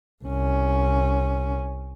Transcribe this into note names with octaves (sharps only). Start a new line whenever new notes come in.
C2 C#4